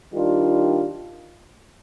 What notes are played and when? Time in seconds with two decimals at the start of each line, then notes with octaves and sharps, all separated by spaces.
0.14 D#3 G3 D4 F4